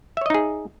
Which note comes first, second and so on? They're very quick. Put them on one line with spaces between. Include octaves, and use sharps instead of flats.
E5 C#5 D#5 D#4 G#4